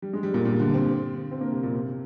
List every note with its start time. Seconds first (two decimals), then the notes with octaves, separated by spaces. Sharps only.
0.02 G3
0.13 G#3
0.23 G3
0.34 A#2
0.45 A#2
0.59 D3
0.74 C4
1.31 C4
1.41 A#3
1.52 C3
1.63 A#2
1.73 C3